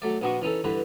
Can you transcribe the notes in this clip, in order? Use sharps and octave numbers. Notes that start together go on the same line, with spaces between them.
F#3 A3 D5
A#1 B3 D4 F#4 D#5 C#6
E3 C#4 D#4 A4
G2 D3 E3 B4